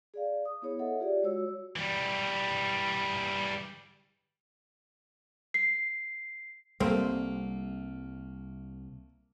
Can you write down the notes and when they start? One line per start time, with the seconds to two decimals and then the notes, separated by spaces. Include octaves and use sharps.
0.14 G#4 D5 F5
0.45 D#6
0.62 B3 E4 G#4 C#5
0.79 A4 C#5 D#5 E5 F#5
1.00 F4 G4 G#4 D5
1.23 G#3 F#4 C#5 E6
1.76 E3 G3
5.54 C7
6.80 C2 G3 A3 A#3 C4